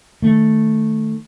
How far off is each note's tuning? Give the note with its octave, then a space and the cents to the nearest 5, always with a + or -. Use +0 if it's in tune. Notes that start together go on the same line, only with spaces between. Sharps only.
D#3 +0 A3 +0